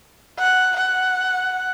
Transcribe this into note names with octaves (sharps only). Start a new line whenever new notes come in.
F#5
F#5